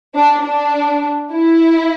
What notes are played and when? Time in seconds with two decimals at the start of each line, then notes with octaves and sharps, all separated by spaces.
0.15 D4
0.44 D4
1.32 E4